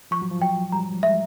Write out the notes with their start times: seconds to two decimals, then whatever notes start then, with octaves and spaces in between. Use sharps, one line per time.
0.11 F3 C#6
0.22 F#3
0.31 F3
0.42 F#3 G5
0.72 G3 A#5
1.03 G#3 E5